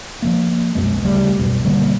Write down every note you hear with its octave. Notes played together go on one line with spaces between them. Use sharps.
F3 F#3 A#3
C2 F#2 B2 G#3
D2 C#3 G3 A3
B1 F#2 B2
B2 D3 G3 A#3